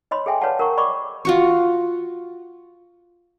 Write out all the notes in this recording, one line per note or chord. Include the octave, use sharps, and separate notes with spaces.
C#5 D#5 B5 C6
G#4 A4 E5 G5 G#5
B4 C#5 D5 F5 F#5 A5
A#4 F#5 A#5 C#6
D5 D#5 B5 C#6 D6
F4 F#4 C#6